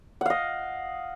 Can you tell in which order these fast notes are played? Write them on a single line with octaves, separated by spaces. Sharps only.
F#5 F5 D#5